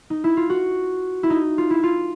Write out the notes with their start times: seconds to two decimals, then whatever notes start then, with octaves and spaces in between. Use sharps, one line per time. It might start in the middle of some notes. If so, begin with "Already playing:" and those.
0.10 D#4
0.24 E4
0.37 F4
0.50 F#4
1.23 E4
1.30 D#4
1.58 F4
1.70 E4
1.83 F4